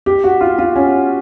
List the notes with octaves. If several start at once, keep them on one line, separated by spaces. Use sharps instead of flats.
G4
F#4
F4
F4
C#4